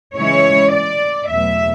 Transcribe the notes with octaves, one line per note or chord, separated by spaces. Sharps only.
C#3 E3 G#3 C#4 E4 C#5
D5
E2 B2 F#3 A3 E5